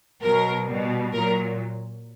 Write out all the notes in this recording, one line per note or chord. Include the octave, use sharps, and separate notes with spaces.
B2 F#3 A#4
B2 G3
A#2 F#3 A#4